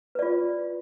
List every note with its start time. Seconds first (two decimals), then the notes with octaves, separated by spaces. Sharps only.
0.15 B4
0.19 D5
0.22 F4